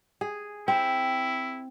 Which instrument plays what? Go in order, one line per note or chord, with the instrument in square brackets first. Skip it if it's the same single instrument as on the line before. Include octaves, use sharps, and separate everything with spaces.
[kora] G#4
[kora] C4 [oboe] E4